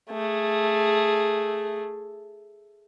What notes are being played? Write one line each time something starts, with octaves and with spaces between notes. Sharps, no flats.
A3 G#4